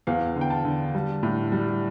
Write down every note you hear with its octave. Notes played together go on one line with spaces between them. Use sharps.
E2 F5
D3
G5
A5
D3
G3
A2
G3